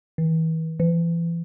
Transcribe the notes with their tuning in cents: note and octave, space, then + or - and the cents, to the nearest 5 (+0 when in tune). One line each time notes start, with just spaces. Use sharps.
E3 -40
E3 +35